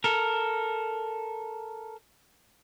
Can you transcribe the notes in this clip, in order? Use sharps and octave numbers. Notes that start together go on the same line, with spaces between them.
A4 A#4